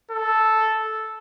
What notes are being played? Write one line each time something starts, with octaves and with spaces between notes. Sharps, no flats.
A4